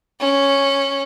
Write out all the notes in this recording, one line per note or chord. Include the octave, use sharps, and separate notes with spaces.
C#4